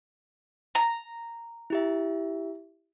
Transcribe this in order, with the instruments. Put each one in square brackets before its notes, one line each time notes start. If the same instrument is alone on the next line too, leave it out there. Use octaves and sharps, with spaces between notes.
[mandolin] A#5
[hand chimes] E4 G4 E5